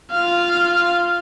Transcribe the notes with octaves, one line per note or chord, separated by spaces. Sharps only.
F4 F5